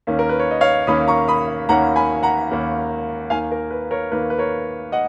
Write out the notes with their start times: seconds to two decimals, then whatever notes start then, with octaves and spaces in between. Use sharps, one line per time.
0.07 D#2 D#3 A#3 C#4
0.19 A#4
0.29 B4
0.40 C#5
0.51 D#5
0.61 C#5 F5
0.87 D#2 D#3 A#3 C#4 B5 D#6
1.08 A#5 C#6
1.28 B5 D#6
1.69 D#2 D#3 A#3 C#4 F#5 A#5
1.96 G#5 B5
2.23 F#5 A#5
2.50 D#2 D#3 A#3 C#4
3.30 D#2 D#3 A#3 F5 G#5
3.52 A#4
3.71 B4
3.91 A#4 C#5
4.11 D#2 D#3 A#3 B4
4.30 B4
4.38 A#4 C#5
4.92 D#5 F#5